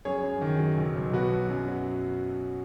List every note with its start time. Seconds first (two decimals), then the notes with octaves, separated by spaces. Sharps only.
0.05 F#2 G#4 C#5
0.23 F#2
0.42 D#3
0.59 F#3
0.78 B1
0.96 B1
1.13 B2 F#4 B4
1.32 F#3
1.50 F#2
1.68 F#3